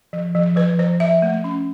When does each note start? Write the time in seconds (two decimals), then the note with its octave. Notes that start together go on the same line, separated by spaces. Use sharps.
0.13 F3
0.35 F3
0.56 F3 B4
0.79 F3 C5
1.00 F3 E5
1.22 A3
1.44 C#4